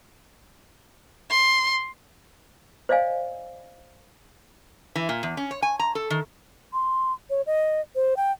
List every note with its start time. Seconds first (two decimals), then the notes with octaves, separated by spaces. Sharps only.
1.30 C6
2.89 C5 D5 D#5 F5 G#5
4.95 E3
5.09 A#2
5.23 E2
5.37 C#4
5.51 C#5
5.62 G#5
5.79 A#5
5.95 A4
6.10 D#3
6.73 C6
7.30 C#5
7.46 D#5
7.95 C5
8.17 G5